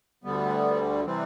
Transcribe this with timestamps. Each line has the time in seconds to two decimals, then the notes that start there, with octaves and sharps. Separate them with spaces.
0.24 D2 D3 G3 B3
1.05 C3 E3 G3 C4